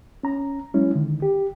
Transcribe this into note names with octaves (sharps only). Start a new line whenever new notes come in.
C#4 A#5
F#3 G#3 C#4 E4
D3 D#3
G4